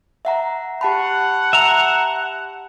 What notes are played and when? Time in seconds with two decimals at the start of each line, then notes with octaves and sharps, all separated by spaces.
0.25 E5 F#5 A#5
0.81 G4 F#5 A5 B5
1.53 E5 A#5